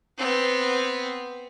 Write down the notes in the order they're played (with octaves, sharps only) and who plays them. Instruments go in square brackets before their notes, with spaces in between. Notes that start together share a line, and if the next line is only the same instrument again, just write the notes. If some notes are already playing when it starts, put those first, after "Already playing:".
[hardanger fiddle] B3 C4